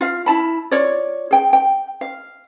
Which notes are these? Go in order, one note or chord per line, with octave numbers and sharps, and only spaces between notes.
F4 F5
E4 A5 B5
F4 C#5 D5
G#4 G5
G5
F5